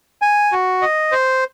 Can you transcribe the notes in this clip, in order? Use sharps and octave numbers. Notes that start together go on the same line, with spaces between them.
G#5
F#4
D#5
C5